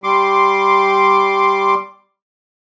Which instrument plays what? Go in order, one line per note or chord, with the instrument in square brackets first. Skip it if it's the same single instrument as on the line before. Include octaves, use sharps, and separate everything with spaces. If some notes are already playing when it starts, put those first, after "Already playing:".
[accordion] G3 C6 D6